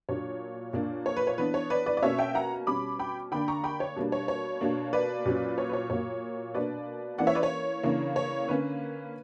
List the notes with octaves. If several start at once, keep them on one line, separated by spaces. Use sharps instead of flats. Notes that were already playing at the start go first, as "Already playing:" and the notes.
A#2 F#3 A#3 D4 C#5
A#2 A#3 D4
C#5
B4
C#5
E3 B3 D4 B4
C#5
B4 D5
B4 D5
D5
B2 A#3 C#4 C#5 E5
E5 G5
F#5 A#5
B2 G3 C#4 B5 D6
G5 B5
D3 A#3 D4 G5 B5
A#5 C#6
G5 B5
C#5
B2 G3 A#3 D4
C#5
C#5
B2 A#3 D4
B4 D5
A#2 F#3 C#4
C#5
B4
C#5
A#2 F#3 A#3 C#5
B2 A#3 D4 B4 D5
E3 A#3 C#4 D5 F#5
C#5 E5
B4 D5
C#5
C#3 E3 A#3 D4
C#5
D3 A#3 C#4 B4